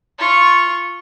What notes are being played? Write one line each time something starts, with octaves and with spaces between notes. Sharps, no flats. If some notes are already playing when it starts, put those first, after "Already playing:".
F4 C#6